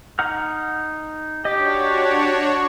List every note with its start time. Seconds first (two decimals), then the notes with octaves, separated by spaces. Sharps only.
0.19 D#4 F#5 F6
1.45 D4 F#4 G4 C#5 D#5